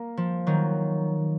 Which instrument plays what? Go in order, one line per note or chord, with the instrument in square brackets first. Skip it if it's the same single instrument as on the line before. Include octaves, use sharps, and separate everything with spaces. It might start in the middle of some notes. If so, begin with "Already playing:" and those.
Already playing: [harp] A#3
F3
D#3 F#3